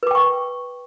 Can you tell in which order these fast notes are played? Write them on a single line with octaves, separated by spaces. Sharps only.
B4 D6 G5 C#6